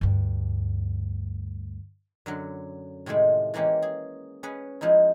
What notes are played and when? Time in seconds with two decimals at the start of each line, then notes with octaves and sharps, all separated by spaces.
0.01 D2 G2
2.26 F#2 D3 F#3
3.06 A2 C3 D#3 G#3 A3
3.54 E3 G#3 A#3 C#4 G4
3.82 G#4
4.43 C#4 G#4 B4
4.81 F3 G#3 D#4 E4